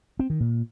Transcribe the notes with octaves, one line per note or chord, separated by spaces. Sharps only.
C4
D#3
A#2